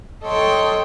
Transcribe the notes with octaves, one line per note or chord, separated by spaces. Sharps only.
A4 C#5 D#5 G5 C6